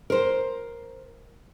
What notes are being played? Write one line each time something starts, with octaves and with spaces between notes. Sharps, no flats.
A#4 C5